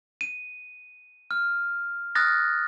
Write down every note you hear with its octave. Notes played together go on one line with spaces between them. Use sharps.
D#7
F6
D#6 F6 F#6 A6 A#6